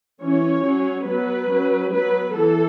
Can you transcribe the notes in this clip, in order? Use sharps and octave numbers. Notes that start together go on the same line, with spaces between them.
E3 C#4 C#5
F#3 C#4
F#3 B3 B4
F#3 C#4
F#3 B3 B4
E3 A4